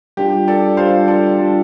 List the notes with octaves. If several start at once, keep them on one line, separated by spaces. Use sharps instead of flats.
G3 D4 F4 G4
A4 D5
G3 D4 F4 C5 F5
A4 D5
G3 D4 F4